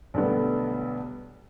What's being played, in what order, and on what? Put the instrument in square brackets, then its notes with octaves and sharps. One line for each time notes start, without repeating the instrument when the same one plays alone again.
[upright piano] B1 D3 G3 A3 B3